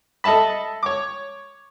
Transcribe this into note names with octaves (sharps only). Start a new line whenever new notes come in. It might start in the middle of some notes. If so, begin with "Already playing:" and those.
A4 D#5 E5 A5 B5
C#5 D6